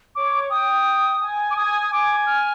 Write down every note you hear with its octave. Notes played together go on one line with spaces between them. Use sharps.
C#5 D6
G5 D#6
G#5
D6
G#5 D#6
D#6
G#5 D6
F6